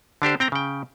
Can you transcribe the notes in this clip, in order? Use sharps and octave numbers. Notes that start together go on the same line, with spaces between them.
D3 D4 G4 C5
C4 G5 A#5
C#3 G5